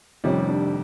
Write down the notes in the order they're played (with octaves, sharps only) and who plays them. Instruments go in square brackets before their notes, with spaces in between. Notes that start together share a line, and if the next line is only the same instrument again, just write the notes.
[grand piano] F1 F2 C3 D#3 G3 [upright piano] C#4
[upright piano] D4